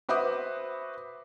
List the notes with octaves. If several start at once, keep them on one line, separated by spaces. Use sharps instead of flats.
F#4 B4 C5 E5 D6 D#6